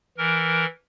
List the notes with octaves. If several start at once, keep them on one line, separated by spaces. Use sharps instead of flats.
E3 A#4